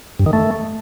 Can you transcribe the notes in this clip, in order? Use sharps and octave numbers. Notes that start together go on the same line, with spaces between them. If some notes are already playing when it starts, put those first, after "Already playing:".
G2
D#3
A3